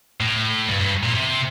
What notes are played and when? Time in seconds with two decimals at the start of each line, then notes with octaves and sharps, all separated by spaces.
0.20 A2
0.68 G2
0.80 G2
1.03 A#2
1.15 C3